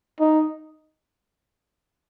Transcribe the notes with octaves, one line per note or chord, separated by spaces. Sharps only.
D#4